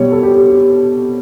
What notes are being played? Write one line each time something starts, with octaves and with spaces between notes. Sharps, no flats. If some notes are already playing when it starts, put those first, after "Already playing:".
Already playing: B2 G3 B3 C#5
A4
G4
G4
G4